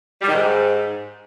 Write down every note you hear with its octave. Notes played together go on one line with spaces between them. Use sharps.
G3
D#3
G#2